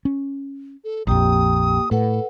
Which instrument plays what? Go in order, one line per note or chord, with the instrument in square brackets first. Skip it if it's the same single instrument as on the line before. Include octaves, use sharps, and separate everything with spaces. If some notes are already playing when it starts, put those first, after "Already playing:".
[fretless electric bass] C#4
[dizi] A4
[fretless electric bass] A#1 F2 [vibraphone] A#3 G4 G5 [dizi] D#6
[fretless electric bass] A2 [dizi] A4 [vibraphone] B4 F#5